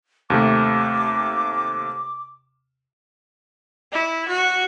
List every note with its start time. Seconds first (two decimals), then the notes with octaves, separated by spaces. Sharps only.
0.30 D#2 C3 A3 D6
3.92 E4
4.28 F#4